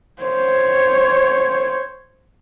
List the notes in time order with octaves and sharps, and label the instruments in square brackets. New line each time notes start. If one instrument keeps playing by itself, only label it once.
[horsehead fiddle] C5 C#5